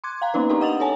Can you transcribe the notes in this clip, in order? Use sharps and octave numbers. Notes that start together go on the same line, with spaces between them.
C6 D6 F#6 G#6
F5 G5 A#5
A#3 B3 C#4 D#4 B4
C4 D4 G4 A#4 D5 A#5
D#5 F#5 D#6 A6 F7 F#7
A4 A#4 C#5 G#5 A5